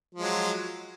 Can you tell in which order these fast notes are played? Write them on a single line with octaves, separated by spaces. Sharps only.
F3 G#3 F#3